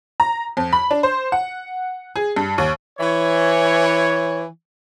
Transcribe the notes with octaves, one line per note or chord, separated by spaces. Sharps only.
A#5
F2
B5
D4
C5
F#5
G#4
G2
D#2
E3 C#5